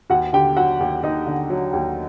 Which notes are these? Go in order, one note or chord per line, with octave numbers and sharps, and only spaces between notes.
D#2 F#4 F#5
D3 G4 G5
F#3 F#4 F#5
D#2
D#2 D#4 D#5
D3
F#3
D#2